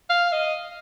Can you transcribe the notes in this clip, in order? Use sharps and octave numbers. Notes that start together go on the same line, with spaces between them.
F5
D#5